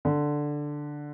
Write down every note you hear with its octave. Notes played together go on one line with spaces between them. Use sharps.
D3